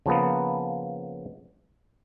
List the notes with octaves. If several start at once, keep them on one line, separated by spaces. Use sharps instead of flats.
C#3 F3 A#3 B3